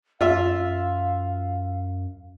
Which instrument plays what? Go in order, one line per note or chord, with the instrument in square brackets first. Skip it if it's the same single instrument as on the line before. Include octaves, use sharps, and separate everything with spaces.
[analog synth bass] F#2 [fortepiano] F4 E5 [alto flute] F5